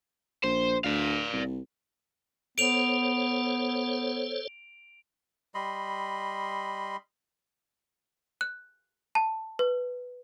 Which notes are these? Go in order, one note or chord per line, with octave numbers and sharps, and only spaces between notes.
A#1 C5
D2 D5 F5
C2
B3 A4 C5 C#5 D7 F7
G3 D#5 B5 C6
F#6
A5
B4